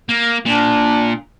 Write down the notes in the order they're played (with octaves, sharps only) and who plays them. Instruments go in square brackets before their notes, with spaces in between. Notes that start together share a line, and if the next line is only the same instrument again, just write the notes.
[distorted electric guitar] A#3
[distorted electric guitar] A#2 [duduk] D4